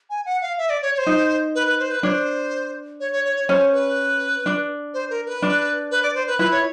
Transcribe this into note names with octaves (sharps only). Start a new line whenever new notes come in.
G#5
F#5
F5
E5
D5
C#5
C#5
C5
D#4
B4
B4
C5
B4
D4 C#5
C5
C#5
C#5
C#5
C#5
C#4 C5
B4
D4
C5
A#4
B4
D4
B4
D5
C5
B4
E4 B4
C#5